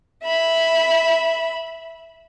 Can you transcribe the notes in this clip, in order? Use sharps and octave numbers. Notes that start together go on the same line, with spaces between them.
E5 B5